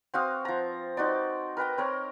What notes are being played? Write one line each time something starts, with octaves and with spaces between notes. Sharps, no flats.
C4 F#4 F5 D#6
F3 A#5
D#4 F#4 C5 D5
A#4 B4 G5 A#5
C4 A#4 C#5